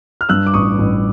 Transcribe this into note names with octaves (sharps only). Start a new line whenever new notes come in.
F6
G2 E6 F#6
D6
A1 C#6 D#6
A1